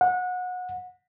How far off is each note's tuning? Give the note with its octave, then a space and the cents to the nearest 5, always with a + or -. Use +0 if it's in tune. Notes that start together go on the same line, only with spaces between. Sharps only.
F#5 -25